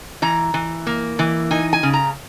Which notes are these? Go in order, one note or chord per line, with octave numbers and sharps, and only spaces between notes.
E3 A#5
E3
A#3
E3
D#4 G#5
G#5
C#3
A#5